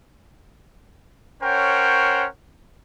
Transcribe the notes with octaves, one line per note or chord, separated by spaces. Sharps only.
C#4 A#4 C5 C#5 F#5 G5